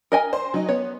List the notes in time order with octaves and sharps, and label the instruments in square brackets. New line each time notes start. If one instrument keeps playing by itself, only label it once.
[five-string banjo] A#4 D#5 G#5
[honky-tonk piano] C5
F#3 D#4
[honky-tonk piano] B3 [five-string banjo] C#5